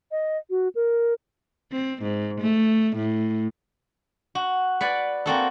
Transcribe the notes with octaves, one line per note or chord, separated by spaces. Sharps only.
D#5
F#4
A#4
C4
G#2
A3
A2
F#4
B4 D5 F#5 G#5
A#3 C4 F#4 A4